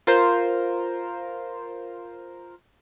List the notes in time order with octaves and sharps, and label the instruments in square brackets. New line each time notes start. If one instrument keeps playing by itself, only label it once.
[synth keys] F4 A#4 C5